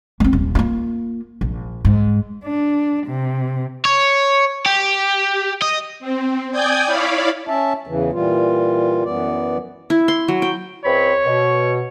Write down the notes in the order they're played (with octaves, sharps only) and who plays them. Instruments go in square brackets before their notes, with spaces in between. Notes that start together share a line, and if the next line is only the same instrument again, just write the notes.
[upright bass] A#3 C4
D#1
A#3 F4
A#1
G#2
[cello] D4
C3
[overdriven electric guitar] C#5
G4
D#5
[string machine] C4
D5 G5 G#5 D#6 G6 G#6
E4 C#5 D5 F5 B5
[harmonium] C#4 E5 A5
E2 C#3 E3
A#2 E3 G3 F4
F#2 E3 B3 D5
[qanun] E4
C6
F#3
G5
[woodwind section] C#2 C4 B5 [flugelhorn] C#5
[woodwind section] B2